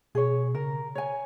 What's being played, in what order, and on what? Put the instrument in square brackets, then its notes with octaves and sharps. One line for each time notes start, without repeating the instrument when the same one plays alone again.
[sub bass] B2 [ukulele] G#4 C#5
[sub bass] C#3 [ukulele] A#4
[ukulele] C#5 G#5